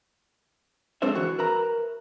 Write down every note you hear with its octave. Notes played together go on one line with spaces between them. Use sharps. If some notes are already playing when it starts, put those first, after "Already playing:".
G#3 C4 D4 A4 C5 E5
E3 F#4
A#4 B4 E5 A#5